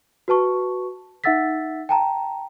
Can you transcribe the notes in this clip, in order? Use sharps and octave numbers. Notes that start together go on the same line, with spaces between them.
F#4 B4 A5 C#6
D#4 E5 F#5 E6 A6 B6
G5 A5 A#5